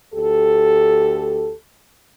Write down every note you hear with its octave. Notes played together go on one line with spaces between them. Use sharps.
D2 G4 A4